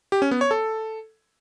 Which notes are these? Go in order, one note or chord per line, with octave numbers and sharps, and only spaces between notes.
G4
C#4
B3
C#5
A4